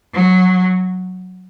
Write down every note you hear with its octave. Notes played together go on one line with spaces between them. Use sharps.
F#3